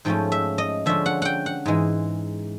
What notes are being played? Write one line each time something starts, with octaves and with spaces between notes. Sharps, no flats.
G#2 F3 A3 C#4 G5
E5
D#5
D3 F3 G#3 C#4 E5
F#5
F#5 G5
F#5
G#2 E3 G#3